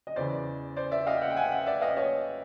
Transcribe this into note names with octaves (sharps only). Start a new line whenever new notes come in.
D#5
E2 C#3 E3 C5 D5
C5 D5
D5 E5
D#5 F5
G5
E5 F#5
G5
F#5 G#5
E5 F#5
D5 E5
D#5 F5
C#5 D#5